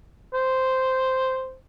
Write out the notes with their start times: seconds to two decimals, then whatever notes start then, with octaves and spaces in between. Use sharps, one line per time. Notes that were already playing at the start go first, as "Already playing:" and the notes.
0.34 C5